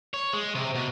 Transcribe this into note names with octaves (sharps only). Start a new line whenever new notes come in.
C#5
G#3
C3
B2